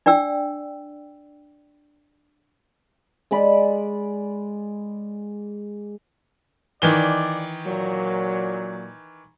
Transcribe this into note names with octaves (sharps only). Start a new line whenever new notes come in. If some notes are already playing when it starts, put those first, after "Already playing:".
D4 D5 G5 E6
G#3 D5 B5
D#3 E3 D5 G7
A#2 F#3